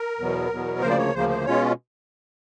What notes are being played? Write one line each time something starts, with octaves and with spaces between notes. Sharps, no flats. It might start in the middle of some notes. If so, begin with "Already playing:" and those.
Already playing: A#4
E2 B2 F#3 B3
E2 B2 F#3 B3
D2 C#3 F3 A#3 C5
D5
C#5
D2 C#3 F3 A#3 C5
C5
B2 G#3 C#4 F4 C#5